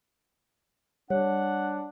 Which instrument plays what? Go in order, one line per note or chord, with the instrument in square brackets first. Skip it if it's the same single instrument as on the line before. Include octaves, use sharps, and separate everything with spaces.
[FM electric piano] G3 [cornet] D4 [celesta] C#5 [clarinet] F#5